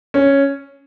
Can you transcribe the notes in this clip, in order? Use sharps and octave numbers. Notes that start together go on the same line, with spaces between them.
C#4